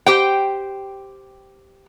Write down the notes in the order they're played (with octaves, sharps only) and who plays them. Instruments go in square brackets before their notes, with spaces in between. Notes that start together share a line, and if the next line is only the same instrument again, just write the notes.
[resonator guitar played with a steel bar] G4 C5 G5